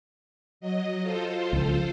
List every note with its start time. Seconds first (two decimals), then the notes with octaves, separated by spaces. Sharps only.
0.61 F#3 D#5
1.02 F4 A4 C5
1.53 C#2 F3